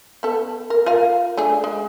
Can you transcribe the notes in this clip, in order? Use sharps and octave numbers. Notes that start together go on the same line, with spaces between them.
B3 A4
A#4
F4 A#4 F5
A3 D4 G#4
G#3